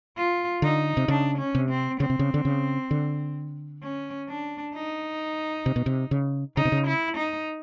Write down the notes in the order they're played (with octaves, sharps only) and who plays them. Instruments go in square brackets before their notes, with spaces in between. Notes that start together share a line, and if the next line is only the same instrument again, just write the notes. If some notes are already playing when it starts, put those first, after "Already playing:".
[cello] F4
[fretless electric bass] D3 [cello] D#4
[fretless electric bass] C3
[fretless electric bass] C#3 [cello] D4
[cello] C#4
[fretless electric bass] C3
[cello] C4
[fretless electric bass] C#3 [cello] C4
[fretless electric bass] C3
C#3
D3
C#3
D3
[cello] C#4
D4
D#4
[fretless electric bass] C3
B2
C3
C#3
[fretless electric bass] C#3 [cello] D#4
[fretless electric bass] C3
C#3
[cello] E4
D#4